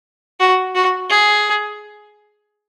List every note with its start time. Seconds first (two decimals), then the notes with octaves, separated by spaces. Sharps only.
0.40 F#4
0.75 F#4
1.10 G#4